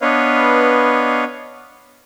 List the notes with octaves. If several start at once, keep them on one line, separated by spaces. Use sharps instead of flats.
B3 D4 B4 C#5 D#5 F5